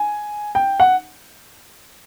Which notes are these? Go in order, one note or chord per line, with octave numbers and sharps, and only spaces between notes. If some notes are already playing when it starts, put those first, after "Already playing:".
Already playing: G#5
G5
F#5